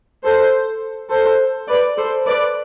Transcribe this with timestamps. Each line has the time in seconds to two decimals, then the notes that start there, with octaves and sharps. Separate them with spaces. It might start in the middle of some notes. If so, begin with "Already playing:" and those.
0.23 A4 C5
1.10 A4 C5
1.68 B4 D5
1.97 A4 C5
2.26 B4 D5